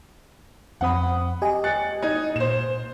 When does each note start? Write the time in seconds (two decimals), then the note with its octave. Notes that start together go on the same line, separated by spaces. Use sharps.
0.81 F2 C4 F#5 B5 D#6
1.42 G4 D#5 G#5
1.64 F#6 A6 C#7
2.02 D#4 D#6 G#6
2.36 A#2 C5 E7